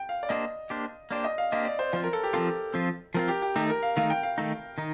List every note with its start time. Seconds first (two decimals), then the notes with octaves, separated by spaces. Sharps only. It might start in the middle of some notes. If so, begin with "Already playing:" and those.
Already playing: G5
0.09 F5
0.23 D5
0.29 A#3 D4 G4 C5 D#5
0.70 A#3 D4 G4 C5
1.11 A#3 D4 G4 C5 D5
1.24 D#5
1.38 F5
1.52 A#3 D4 G4 C5 D#5
1.65 D5
1.79 C5
1.93 F3 C4 F4 C5
2.03 A#4
2.13 A4
2.23 G4
2.33 F3 C4 F4 A4
2.74 F3 C4 F4
3.14 F3 C4 F4 A#4
3.28 G4
3.42 G4
3.56 D#3 A3 D#4 G4
3.70 A#4
3.83 F5
3.96 D#3 A3 D#4 F5
4.10 G5
4.23 F5
4.38 D#3 A3 D#4
4.78 D#3 D#4